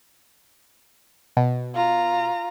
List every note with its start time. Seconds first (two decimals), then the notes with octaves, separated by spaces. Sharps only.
1.37 B2
1.74 F4 A#5